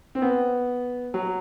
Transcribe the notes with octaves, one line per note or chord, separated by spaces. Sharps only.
C4
B3
F#3